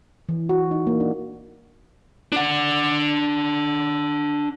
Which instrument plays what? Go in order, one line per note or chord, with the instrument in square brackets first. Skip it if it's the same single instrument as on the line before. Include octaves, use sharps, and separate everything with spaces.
[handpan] E3
F#4
D#4
A#3
D4
[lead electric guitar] D4 F#5